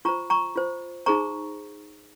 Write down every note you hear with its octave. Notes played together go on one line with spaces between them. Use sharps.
F4 C5 A#5 C#6
A#5 C#6
F4 C5
D#4 G#4 C5 A#5 C#6